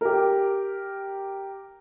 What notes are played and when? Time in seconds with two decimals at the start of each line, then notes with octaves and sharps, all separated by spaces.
0.01 G4 A#4